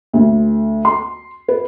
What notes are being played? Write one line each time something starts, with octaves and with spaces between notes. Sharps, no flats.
D2
C6
B4